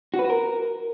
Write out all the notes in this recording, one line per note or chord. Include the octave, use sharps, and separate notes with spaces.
F#4
B4
F#4
A#4